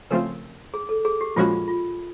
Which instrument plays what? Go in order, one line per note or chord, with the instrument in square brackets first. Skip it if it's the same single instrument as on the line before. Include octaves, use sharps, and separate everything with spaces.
[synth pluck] C#3 F3 A3 C4 F4 [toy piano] A#4
[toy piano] G#4
A4
G#4
G4
[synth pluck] A#2 F3 G#3 C#4 F#4 [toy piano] F4
[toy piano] F4